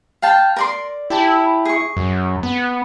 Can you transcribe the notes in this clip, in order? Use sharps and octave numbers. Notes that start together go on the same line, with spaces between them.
F5 G5 A5
A#4 D5 C6
E4 G4 A5
G#4 C#6
F#2
B3